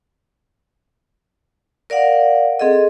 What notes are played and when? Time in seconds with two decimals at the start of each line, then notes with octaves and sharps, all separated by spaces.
1.90 A#4 D5 F5 F#5
2.59 C4 G#4 A4 D#5